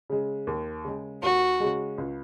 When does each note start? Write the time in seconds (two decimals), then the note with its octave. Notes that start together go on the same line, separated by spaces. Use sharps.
0.10 C#3 G#3
0.47 D#2
0.85 C#3 G#3
1.22 D#2 F#4
1.60 C#3 G#3
1.98 C#2